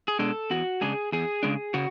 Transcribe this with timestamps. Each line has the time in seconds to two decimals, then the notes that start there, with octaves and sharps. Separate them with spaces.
0.08 G#4
0.19 B2 G#3 D4 A4
0.50 E2 F#4
0.81 C#3 G#3 D4 G#4
1.12 E2 G#4
1.43 C#3 G#3 D4
1.74 C#3 F#4